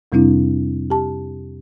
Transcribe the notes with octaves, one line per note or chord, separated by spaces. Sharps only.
F2 C3 G3 C4 D4 E4
G4 A5